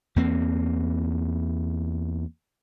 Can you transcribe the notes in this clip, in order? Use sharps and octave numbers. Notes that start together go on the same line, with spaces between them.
E2 A#3 C4